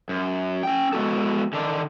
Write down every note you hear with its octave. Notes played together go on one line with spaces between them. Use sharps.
F#2
C#4 G5
G#3 B3 F#4 A4
D3 D#3 D4